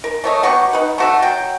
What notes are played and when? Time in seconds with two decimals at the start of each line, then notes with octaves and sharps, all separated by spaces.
0.04 A#4
0.24 A3 C#5 D#5
0.43 F#3 B3 G4 C#6
0.73 D#4 B4
0.98 A3 F#4 E5
1.22 F#3 G5